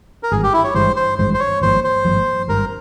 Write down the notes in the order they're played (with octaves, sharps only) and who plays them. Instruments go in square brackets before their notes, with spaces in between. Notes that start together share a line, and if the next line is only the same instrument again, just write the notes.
[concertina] A#4
[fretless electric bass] G#1 G2 E3 [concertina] G#4
[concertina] G4
E4
C#5
[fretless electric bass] G#1 G2 E3 G#3 [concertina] C5
[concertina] C5
[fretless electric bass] G#1 G2 E3 G#3 [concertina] C5
[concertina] C5
C#5
[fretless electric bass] G#1 G2 F3 A#3 [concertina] C5
[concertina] C5
[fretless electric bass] G#1 G2 F3 A#3
[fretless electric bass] G#1 G2 G3 [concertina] A#4